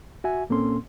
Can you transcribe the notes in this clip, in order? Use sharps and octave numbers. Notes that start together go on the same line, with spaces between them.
F#4 E5 G#5
A#2 A#3 C4 C#4 A4 C6